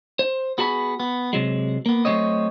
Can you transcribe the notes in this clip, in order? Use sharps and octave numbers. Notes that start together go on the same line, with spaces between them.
C5
B3 F#4 G#4 A5 B5
B3
C3 F#3 G#3
A#3 B3
F#3 G#3 A3 C4 C#5 D#5